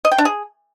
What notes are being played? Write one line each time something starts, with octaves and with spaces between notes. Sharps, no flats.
D#5
G5
D4
G#4